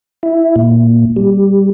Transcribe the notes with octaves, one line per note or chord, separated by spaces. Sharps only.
E4
A#2
G3